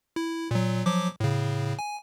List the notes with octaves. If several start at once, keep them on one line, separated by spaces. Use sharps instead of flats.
E4
A#2 F#3
F3 F#3 D6
A2 C#3
G#5